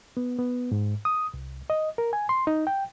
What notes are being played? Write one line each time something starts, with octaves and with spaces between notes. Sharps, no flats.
B3
B3
G#2
D#6
C2
D#5
A#4
G#5
C6
D#4
G5